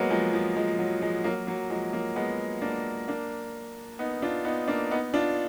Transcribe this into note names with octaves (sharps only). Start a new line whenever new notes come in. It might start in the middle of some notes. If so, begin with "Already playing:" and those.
Already playing: F#3 G#3 A#3 B3
F3 G#3
F3
F3 G#3
F#3
F3 G#3
F#3 A#3
F#3 A#3
F3 G#3
F#3 A#3
G#3 B3
A#3 D4
A#3 D4
B3 D#4
D4 F4
B3 D#4
A#3 D4
B3 D#4
D4 F4